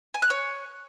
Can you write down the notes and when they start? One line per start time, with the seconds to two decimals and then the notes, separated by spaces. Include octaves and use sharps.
0.14 G#5
0.22 F#6
0.30 C#5